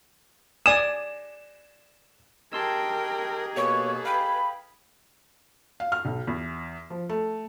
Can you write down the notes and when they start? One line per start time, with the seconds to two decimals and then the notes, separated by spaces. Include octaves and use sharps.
0.66 D5 G#5 D#6 E7
2.53 D#4 G4 G#4 A#4 G5 A5 C6 E6
3.57 B2 A#3 A4 B4 C#5
4.05 F5 G5 B5
5.80 F5
5.92 F6
6.05 B1
6.27 E2
6.90 F3
7.09 A3